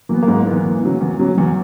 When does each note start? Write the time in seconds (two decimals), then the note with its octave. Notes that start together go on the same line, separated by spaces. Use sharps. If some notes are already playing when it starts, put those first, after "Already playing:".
0.09 E3 F#3 A#3 B3
0.23 A#3
0.28 G#2 G#3
0.46 E3 B3
0.65 E2
0.83 C#3 F#3
1.01 E2
1.19 C#3 F#3
1.38 E2 F#3 A#3